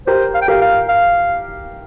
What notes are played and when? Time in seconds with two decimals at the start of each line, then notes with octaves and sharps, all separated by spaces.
0.07 G4 A#4 C5
0.35 F5
0.41 G5
0.48 G4 A#4 F5
0.61 F5
0.89 F5